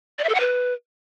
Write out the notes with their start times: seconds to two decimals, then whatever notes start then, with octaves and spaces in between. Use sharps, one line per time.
0.18 D5
0.24 E5
0.29 A4
0.35 F#5
0.40 B4